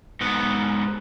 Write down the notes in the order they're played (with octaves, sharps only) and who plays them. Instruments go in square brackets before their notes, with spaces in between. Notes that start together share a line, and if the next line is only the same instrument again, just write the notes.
[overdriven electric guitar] G#2 B3